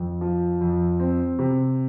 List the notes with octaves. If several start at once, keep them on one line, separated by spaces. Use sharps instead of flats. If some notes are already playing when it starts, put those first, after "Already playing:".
Already playing: F2
F3
F2
C4
C3